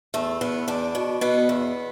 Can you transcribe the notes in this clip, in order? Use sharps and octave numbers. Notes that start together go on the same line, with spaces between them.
E2 A3
E2 B3
E2 D4
B2
B2 B3
E2